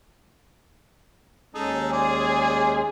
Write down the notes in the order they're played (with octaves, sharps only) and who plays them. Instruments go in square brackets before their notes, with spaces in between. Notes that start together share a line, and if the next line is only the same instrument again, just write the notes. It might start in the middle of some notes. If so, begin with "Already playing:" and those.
[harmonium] D#2 G#3 C#4 [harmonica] D#4 G#4 A4
[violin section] G#4 [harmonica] C5 D5